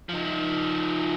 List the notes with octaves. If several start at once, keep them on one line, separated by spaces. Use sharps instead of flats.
F3 D#4